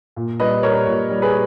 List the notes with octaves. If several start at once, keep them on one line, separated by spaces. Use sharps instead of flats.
A#2
G3 B4 D#5
G3 A#4 C#5
A#2
G3
G#4 B4